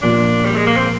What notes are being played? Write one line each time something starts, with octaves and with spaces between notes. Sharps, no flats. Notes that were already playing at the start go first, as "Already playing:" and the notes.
A#2 F3 A#3 D4 F4
G3
G#3
A#3
C4